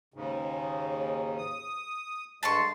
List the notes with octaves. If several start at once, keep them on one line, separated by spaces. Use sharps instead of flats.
D#2 G#2 C#3
D#6
G2 D3 G#3 A5 C6 C#6